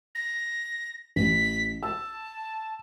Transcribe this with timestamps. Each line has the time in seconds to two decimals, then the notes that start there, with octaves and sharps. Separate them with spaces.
0.15 A#6
1.16 A1 B6
1.83 A5 E6